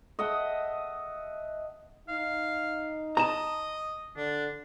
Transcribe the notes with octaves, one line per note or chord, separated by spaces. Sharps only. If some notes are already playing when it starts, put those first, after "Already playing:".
D#5 E5 F#5 A5
D#4 F5
D#5 A5 A#5
D3 D4